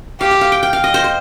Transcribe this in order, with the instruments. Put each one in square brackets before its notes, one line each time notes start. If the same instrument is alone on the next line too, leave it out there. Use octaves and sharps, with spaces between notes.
[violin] G4 [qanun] F5
[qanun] F5
F5
G5
G5
F5
D#5
C5
C5